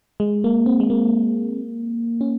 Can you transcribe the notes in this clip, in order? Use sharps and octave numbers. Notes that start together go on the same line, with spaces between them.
G#3
A#3
C4
G#3
A#3
C#4